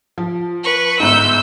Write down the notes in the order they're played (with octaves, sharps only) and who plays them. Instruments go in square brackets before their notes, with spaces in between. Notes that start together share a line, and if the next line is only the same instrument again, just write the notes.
[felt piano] F3
[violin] B4 C#6
[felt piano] G1 G#2 [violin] E6 G6